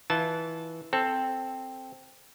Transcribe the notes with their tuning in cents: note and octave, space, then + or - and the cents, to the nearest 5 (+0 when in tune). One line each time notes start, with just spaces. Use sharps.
E3 -15 F4 +0 A5 -15
C4 +0 A4 +0